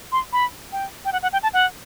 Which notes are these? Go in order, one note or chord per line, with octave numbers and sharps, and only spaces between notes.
C6
B5
G5
G5
F#5
F#5
G5
A5
F#5